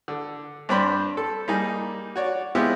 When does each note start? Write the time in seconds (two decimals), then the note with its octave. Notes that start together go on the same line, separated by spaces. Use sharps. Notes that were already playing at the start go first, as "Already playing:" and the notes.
0.08 D3
0.69 G2 C4 D4 C5 G5 B5
1.17 A4
1.48 G3 A#3 D#4 G#4
2.16 F#4 C#5 D5
2.55 G#3 B3 C4 E4 F4 G4